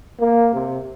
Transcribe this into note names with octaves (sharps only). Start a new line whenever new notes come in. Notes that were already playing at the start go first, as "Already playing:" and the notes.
A#3
C3